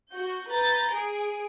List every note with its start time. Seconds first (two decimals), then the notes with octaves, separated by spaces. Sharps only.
0.11 F#4 G6
0.49 B4 A#5 G6 A6
0.92 G#4 D7